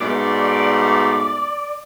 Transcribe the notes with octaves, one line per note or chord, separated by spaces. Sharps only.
G#2 B2 A3 D5